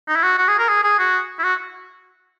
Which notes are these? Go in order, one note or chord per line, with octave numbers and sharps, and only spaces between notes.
D#4
E4
F#4
F#4
G#4
A#4
G#4
G#4
F#4
E4
F#4